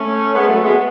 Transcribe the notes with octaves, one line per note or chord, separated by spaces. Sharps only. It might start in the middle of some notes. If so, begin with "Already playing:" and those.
Already playing: A3 C#4
G#3 B3
F#3 A3
G#3 B3